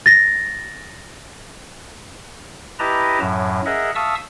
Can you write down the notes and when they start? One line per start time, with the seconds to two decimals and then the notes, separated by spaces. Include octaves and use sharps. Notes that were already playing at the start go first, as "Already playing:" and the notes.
0.06 A6 A#6
2.79 E4 G4 B4 D#5 A5 A#5
3.20 F#2 A2 F#3
3.66 G#4 A#4 D#5 E5 F#5
3.95 E5 F5 A5 C#6 D#6 E6